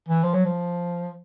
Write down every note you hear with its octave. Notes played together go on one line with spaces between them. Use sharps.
E3
F3
F#3
F3